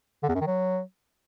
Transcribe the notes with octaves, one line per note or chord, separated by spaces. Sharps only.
D3
E2
F#2
D#3
F#3